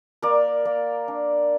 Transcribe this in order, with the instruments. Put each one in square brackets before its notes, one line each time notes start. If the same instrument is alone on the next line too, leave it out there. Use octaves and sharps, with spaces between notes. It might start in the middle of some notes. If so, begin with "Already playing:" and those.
[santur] A#3 A#4 D5
A#3
D4